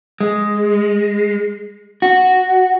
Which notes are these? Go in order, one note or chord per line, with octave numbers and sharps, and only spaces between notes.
G#3
F#4